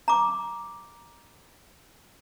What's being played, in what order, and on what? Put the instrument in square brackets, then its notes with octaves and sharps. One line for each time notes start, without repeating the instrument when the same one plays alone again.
[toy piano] A#5 D6